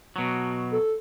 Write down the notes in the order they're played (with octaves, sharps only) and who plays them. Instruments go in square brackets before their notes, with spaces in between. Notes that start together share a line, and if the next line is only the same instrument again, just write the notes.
[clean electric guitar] B2 F#3
[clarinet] A4